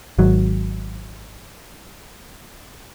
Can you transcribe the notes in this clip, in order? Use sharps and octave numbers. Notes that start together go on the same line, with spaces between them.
G#1 F#3